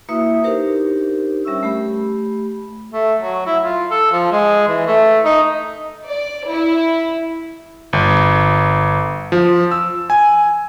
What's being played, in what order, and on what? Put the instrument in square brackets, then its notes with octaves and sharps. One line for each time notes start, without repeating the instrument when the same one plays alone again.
[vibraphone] A#3 E4 F#4 B4 E5 D#6
D4 D#4 G4 A#4 C5
G3 C#4 C#5 E5 C#6 E6
A3 G4 B5
[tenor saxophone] A3
F#3
E4
F4
A4
F3
G#3
E3
A3
D#4
[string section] D5
E4
[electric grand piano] G1
F3
E6
G#5